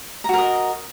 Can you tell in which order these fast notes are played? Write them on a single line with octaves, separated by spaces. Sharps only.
A#5 F#4 A#4 D#5